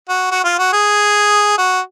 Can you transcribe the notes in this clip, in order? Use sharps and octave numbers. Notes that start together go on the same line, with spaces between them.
F#4
F#4
F4
F#4
G#4
F#4